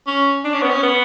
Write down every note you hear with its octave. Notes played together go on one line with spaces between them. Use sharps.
C#4
D4
C#4
B3
C#4
B3